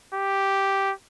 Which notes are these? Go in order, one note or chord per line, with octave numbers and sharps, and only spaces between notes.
G4